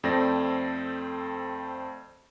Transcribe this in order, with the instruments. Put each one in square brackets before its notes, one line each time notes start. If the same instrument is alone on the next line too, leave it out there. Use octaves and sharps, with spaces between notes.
[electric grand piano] F2 A3 C4 A4 D5 A#6